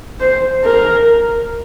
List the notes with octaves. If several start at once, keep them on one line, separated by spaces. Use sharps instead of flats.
C5
A#4